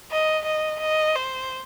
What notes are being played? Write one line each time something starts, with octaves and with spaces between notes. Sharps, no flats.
D#5
D#5
D#5
C5